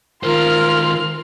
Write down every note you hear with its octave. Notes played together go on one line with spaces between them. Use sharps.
D#3 F4 A#4 C5 C6 F6